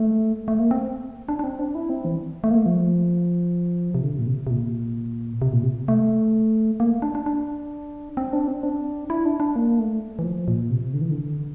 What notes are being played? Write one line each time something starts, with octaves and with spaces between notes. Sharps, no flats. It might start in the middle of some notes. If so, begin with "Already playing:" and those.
Already playing: A3
A3
A#3
C4
D4
D4
C4
D4
E4
C4
E3
A3
A#3
A3
F3
C3
D3
A#2
C3
C3
A#2
C3
A#2
C3
A3
A#3
D4
D4
D4
C4
D4
C4
D4
E4
D4
D4
A#3
A3
E3
F3
A#2
C3
D3
E3
D3